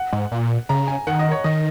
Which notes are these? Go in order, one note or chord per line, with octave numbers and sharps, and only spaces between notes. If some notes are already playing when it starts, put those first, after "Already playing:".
Already playing: F#5
G#2
A#2
C#3 A#5
G#5
D#3 F#5
D#5
C#5
D#3 D#5